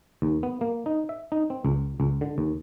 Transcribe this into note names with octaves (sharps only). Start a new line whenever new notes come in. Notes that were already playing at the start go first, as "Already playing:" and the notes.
D#2
B3
A#3
D#4
E5
D#4
C4
C#2
C#2
D3
D#2